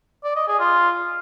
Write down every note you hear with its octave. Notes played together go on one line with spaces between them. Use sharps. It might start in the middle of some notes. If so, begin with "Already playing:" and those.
D5
D#5
G#4
F4